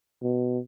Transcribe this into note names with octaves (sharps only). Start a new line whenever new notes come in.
B2